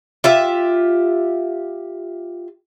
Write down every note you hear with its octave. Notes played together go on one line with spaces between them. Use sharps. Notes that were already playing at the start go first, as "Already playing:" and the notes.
F4 G4 E5